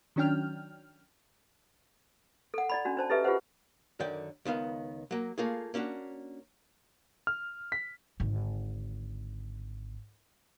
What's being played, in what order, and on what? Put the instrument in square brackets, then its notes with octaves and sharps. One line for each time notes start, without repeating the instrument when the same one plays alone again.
[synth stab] D#3 F#3 C#4 D4 G5 F6
[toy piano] A4 F#5
E4 D5 B5
C#4 D4 F#4
D4 C5 A5
E4 G4 A4 B4 D#5 E5
F4 G4 G#4 B4 C5 F#5
[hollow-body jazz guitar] F#2 D3 D#3 D5 G5
C#2 D#3 B3 F5
F#3 A#3
A3 A#3 F4 G#4
A#3 C#4 D4 F#4
[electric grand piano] F6
B6
[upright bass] G#1 D3